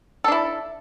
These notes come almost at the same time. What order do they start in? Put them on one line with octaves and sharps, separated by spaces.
A4 D4 E4